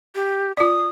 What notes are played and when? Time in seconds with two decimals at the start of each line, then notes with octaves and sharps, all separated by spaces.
0.15 G4
0.57 F4 D5 D#6